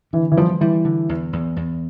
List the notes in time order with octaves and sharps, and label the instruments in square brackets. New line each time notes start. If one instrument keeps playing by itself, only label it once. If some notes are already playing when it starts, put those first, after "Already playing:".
[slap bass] D3 [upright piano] E3
[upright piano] E3
[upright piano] F3 [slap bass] G3
[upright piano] E3 [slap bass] G3
[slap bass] D3
E2
E2
E2